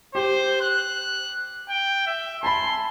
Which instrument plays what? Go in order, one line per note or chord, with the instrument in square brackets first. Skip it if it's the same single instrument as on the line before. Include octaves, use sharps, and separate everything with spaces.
[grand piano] G4 [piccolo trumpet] C5
[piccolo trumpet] F#6
G5
E5
[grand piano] G#5 A5 B5 [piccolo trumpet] C6